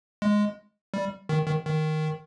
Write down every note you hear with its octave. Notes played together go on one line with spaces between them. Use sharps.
G#3
G3
D#3
D#3
D#3